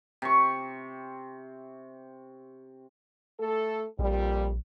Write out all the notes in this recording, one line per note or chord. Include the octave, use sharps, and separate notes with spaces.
C3 C#6
A3 A4
A#1 F2 A#2 G3